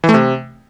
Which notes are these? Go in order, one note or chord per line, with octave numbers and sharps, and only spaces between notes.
E3
A3
C3